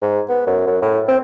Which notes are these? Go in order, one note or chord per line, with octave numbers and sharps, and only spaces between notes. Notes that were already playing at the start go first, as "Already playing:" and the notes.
G#2
B3
F#2
F#2
A2
C4